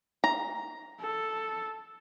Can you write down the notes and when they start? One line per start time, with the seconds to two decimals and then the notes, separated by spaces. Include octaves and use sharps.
0.24 A#5
1.00 A4